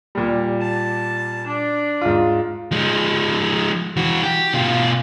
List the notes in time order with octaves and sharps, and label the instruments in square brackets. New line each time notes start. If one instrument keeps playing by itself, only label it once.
[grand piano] A#2 G3
[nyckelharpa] A5
D4
[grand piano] G#2 F4
[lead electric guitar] F3 G#3
E3 F#4
G4
B2 F4